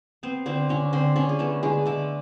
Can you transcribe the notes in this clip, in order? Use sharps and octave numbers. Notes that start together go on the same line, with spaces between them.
B3 C4 C5
D3 C4 C5
D3 C#4 C#5
D3 C4 C5
D3 C#4 C#5
G#4
A3 B3 A4
D3 G#3 G#4
D3 A3 A4